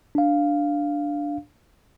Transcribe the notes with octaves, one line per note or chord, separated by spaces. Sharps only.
D4 F5